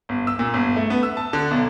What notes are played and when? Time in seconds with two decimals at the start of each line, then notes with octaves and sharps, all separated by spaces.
0.09 G1
0.27 E6
0.39 A#2
0.54 G1
0.76 A3
0.90 B3
1.03 E6
1.17 A5
1.33 D3
1.51 B1